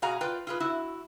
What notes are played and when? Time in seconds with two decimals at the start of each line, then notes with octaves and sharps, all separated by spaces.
0.02 B2 F#4 G#4 F5 A#5
0.21 F4 B4 D5 G5
0.47 F4 G#4 B4
0.60 E4 F#4